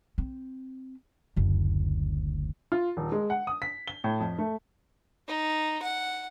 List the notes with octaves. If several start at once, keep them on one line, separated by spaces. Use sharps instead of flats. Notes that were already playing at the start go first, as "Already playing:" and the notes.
C4
F#1 D2
F4
D#1
G#3
F#5
D#6
B6
G7
A2
F2
A3
D#4
F#5